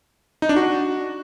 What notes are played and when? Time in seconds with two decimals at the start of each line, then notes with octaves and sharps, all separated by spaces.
0.42 D#4
0.49 D4
0.56 F#4